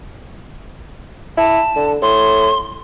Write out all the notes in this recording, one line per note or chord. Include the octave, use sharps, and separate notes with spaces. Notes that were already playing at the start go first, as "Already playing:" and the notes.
E4 A5
D3
A2 C6